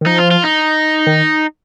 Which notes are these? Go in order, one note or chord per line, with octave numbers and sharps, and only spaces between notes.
D#3
F3 D#4
F4
F4
D#4
D#3